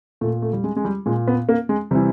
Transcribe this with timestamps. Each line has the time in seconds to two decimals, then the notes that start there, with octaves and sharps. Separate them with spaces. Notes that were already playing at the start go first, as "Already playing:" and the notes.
0.21 A#2 A3
0.42 A3
0.53 G3
0.64 G#3
0.76 G#3
0.85 G3
1.06 A#2 G#3
1.28 B3
1.49 A#3
1.69 G#3
1.91 C3 E3 G3